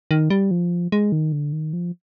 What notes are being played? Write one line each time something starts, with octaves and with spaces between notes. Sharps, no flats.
D#3
G3
F3
G#3
D#3
D3
D#3
F3